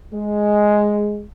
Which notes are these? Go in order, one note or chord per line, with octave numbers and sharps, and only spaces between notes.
G#3